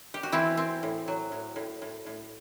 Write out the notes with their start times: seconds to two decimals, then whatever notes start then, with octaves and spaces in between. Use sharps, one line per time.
0.14 G4
0.23 F#4
0.32 E3 C4 E4
0.57 C4
0.83 A2
1.08 F#3
1.32 A2
1.56 A2
1.82 A2
2.06 A2